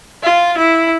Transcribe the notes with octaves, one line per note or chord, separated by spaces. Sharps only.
F4
E4